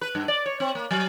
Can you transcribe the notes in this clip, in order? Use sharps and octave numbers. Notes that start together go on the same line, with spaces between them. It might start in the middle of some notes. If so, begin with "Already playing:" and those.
B4
G2
D5
C#5
C4
A#3
F#3